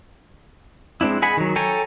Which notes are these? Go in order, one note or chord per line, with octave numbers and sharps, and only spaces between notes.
G#3 C4 D4 E4
G#4 D#5 F#5 G#5 B5
D#3 F#3
A4 C#5 G5 G#5 A#5